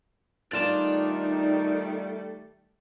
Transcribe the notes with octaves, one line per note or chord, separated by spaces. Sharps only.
D#3 G3 A3 D4 D#4 F4 D5 A5